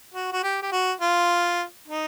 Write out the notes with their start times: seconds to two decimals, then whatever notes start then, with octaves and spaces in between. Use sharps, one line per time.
0.15 F#4
0.33 F#4
0.43 G4
0.63 G4
0.72 F#4
1.01 F4
1.88 D#4